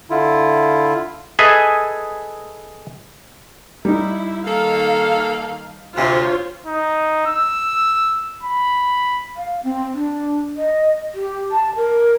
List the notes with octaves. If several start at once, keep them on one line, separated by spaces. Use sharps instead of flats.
D3 E4 F4
G#4 A4 B4 D#5 E5 G#5
G3 D#4 E4
D#3 A#3 A4 F5
D2 C3 F4 C5 C#5
D#4
E6
B5
F5
C4
D4
D#5
G4
A5
A#4